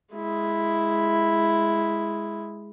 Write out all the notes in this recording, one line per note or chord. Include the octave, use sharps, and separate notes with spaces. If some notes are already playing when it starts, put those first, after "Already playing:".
G#3 E4